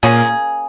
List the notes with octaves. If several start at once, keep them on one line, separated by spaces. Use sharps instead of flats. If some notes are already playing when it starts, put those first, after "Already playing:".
A#2 A#3 C#4 G#4